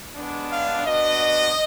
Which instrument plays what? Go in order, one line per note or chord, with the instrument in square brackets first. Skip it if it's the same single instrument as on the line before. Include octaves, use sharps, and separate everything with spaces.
[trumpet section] G#3 B3 D4
F5
B3 D4 F#4 D#5